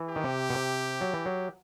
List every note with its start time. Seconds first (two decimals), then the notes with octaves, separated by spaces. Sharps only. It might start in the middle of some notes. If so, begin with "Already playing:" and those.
Already playing: E3
0.09 G4
0.16 D#3
0.24 C3
0.50 B2
0.54 C3
1.01 F#3
1.13 E3
1.26 F#3